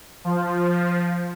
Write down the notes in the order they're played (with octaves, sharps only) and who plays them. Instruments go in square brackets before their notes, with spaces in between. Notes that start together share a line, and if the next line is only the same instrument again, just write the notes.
[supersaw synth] F3